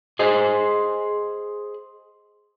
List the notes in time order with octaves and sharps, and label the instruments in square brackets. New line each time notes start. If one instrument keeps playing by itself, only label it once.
[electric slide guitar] G#4 C5 D#5